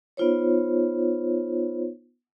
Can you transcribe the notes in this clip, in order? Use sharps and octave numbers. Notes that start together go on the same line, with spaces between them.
B3 D#4 F4 C5 C#5